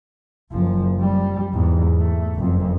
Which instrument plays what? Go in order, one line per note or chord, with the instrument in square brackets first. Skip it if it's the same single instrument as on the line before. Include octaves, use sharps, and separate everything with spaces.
[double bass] F#1 F3
G3
E2 G#2
A3
F#1 F2